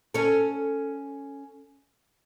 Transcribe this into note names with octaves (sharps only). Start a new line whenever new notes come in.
C#4 A4